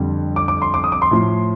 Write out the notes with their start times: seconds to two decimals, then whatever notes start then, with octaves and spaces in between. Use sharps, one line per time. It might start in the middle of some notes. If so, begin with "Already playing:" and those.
Already playing: F2 D3 G3
0.36 D6
0.48 D6
0.62 C6
0.74 D6
0.84 D#6
0.92 D6
1.02 C6
1.11 A2 F3